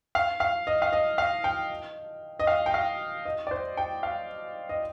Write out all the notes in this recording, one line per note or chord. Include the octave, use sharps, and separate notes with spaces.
F5
F5
D#5
F5
D#5
F5
G5
D#5
F5
G5
F5
D#5
D5
C5
G5
F5
D#5